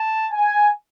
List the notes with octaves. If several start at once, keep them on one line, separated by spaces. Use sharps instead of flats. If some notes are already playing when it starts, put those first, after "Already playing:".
Already playing: A5
G#5